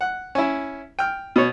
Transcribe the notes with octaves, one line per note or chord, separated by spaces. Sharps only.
F#5
C#4 E4
G5 F6
B2 C#5